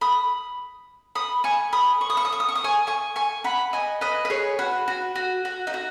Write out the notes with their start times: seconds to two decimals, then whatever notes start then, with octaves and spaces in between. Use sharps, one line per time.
0.01 B5 D#6
1.15 B5 D#6
1.44 G#5 C#6
1.73 B5 D#6
2.01 C#6
2.10 D#6
2.17 C#6
2.25 D#6
2.32 C#6
2.40 D#6
2.49 C#6
2.55 D#6
2.64 G#5 C#6
2.87 G#5 C#6
3.16 G#5 C#6
3.44 F#5 B5
3.73 D#5 G#5
4.01 B4 D#5
4.25 B4
4.30 G#4 C#5
4.59 F#4 B4
4.88 F#4
5.16 F#4
5.45 F#4
5.67 D#4
5.74 F#4